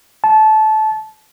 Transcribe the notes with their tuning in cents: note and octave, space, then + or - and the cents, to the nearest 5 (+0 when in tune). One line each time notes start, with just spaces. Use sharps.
A5 -20